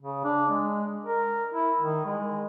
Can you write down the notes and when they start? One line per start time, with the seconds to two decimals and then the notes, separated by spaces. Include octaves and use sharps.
0.02 C#3
0.24 D4
0.49 G#3
1.05 A#4
1.54 E4
1.81 D#3
2.05 G#3